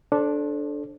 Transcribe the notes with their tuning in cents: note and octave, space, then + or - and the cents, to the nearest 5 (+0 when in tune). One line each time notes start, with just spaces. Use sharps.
D4 +0 A4 -10 C5 +35